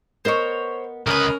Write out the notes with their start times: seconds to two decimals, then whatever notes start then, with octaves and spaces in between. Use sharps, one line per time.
0.25 B3 A#4 C5 C#5 D#5
1.07 C#2 C#4 A#4 B4 D#5 D#6